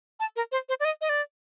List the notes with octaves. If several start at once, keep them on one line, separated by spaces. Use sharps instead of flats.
A5
A#4
C5
C5
D5
D#5
D#5
D5